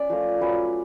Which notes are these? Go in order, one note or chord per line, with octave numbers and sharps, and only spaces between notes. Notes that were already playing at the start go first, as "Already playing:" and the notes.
Already playing: C#4 D5
F3 A3 F4 F5
F#3 C#4 F4 B4